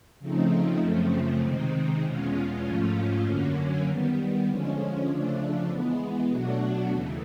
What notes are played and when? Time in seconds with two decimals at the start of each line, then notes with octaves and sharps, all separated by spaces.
0.20 C#3 F3 A3 C4 D#4
0.80 F#2 C#3 F3 A3 C4
1.42 C3 D#3 G#3 C4 D#4
2.03 E2 B2 G#3 C#4 F4
2.63 G#2 F3 A3 C#4 F4
3.25 F#2 D3 F#3 A#3 C#4
3.86 D#3 G3 B3
4.47 D3 F3 G#3 C#4
5.07 C#3 F3 A3 D4
5.69 E3 G#3 B3
6.29 B2 F#3 A3 D4 F#4
6.90 D#2 C#3 E3 A3